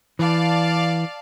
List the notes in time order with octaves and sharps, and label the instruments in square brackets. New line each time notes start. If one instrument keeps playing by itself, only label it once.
[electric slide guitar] E3 [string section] D5 F5 A5